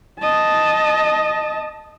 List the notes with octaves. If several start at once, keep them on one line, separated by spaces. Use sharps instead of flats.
D#5 A5